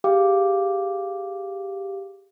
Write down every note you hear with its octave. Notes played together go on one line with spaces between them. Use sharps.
G4 G#4 F5 G5 D6